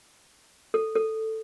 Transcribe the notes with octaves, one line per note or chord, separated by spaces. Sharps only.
A4
A4